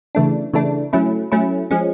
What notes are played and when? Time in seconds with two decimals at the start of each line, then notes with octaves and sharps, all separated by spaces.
0.15 C#3 E3 A3 D4
0.53 C#3 E3 A3 D4
0.93 F#3 A3 C#4 E4
1.32 F#3 A3 C#4 E4
1.71 F3 G#3 C#4